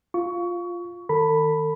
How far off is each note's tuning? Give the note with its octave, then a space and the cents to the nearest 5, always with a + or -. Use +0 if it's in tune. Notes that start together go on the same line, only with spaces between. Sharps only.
F4 +0 C#6 +20
D#3 +0 A4 +40 B5 +0